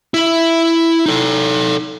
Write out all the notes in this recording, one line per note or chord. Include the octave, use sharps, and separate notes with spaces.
E4 E5
D#4 A4